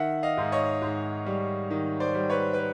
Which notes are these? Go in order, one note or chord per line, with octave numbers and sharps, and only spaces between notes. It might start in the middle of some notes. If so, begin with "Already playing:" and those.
Already playing: D#3 E5 F#5
D#5 F5
G#2
C#5 D#5
G#2
G3
D#3
C5 D5
G3
B4 C#5
B4